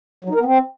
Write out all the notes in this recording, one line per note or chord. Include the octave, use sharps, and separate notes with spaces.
F#3
D#4
A#4
B3
C4